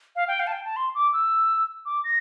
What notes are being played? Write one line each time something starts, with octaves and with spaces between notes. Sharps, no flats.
F5
G5
F5
A5
G5
A5
C6
D6
E6
D6
A#6